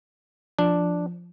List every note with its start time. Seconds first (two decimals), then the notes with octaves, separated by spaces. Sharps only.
0.59 F3 D4